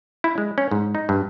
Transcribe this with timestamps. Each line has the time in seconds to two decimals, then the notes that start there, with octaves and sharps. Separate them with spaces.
0.24 E4
0.38 G#3
0.58 C#4
0.71 G#2
0.95 D#4
1.09 G2